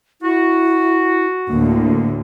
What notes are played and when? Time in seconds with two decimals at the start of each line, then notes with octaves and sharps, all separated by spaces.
0.22 E4 F#4
1.48 D2 A2 A#3